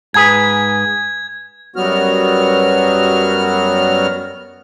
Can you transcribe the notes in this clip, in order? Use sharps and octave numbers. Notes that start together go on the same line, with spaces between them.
G#2 G#4 B4 G#6
F#2 F#3 G3 B3 F#4 F6